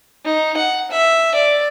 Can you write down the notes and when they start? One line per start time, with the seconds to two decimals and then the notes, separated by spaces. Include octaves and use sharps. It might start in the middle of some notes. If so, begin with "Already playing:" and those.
0.25 D#4
0.57 F#5
0.91 E5
1.35 D5